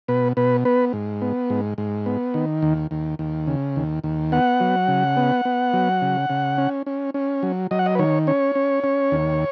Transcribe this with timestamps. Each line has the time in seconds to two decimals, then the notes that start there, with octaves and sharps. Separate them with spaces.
0.08 B2 B4
0.37 B2 B4
0.65 B3 B4
0.93 G#2
1.22 B3
1.50 G#2
1.78 G#2
2.06 B3
2.34 D#3
2.62 D#2
2.91 D#2
3.19 D#2
3.47 C#3
3.76 D#2
4.04 D#2
4.32 B3 F#5
4.60 F#3
4.88 C#3
5.17 B3
5.45 B3
5.73 F#3
6.02 C#3
6.30 C#3
6.58 C#4
6.86 C#4
7.14 C#4
7.43 F#3
7.71 F#3 D#5
7.79 F#5
7.86 D#5
7.95 B4
7.99 D#3 C#5
8.27 C#4 C#5
8.55 C#4
8.84 C#4
9.12 D#2